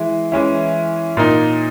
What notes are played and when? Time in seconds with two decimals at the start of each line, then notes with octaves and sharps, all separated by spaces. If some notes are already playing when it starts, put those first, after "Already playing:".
Already playing: E3 G#3 E4
0.32 E3 G#3 C#4 E4
1.17 A#2 A#3 D#4